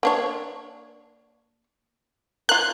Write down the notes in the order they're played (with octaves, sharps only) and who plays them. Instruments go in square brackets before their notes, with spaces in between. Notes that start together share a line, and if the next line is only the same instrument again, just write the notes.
[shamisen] A#3 D4 C#5
[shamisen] F4 A#4 [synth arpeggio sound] F#6